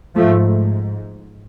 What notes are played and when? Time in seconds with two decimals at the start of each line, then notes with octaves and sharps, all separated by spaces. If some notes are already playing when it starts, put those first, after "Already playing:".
0.15 G#2 F3 A3